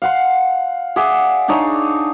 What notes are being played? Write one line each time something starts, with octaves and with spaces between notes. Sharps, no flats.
F5 F#5 C6
G#4 D5 E5 F#5
D4 D#4 G#4 C#5